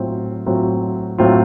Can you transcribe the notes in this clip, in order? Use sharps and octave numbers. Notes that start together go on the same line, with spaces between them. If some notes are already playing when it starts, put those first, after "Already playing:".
Already playing: A2 F#3 C4 F4
A2 F#3 C4 F4
A2 F#3 C4 F4